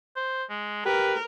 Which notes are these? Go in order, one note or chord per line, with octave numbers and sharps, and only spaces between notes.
C5
G#3
G4 A#4 B4